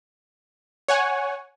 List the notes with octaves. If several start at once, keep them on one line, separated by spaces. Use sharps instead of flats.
C#5 F#5 G#5